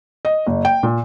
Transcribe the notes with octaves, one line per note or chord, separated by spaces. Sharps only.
D#5
F#1
G5
A#2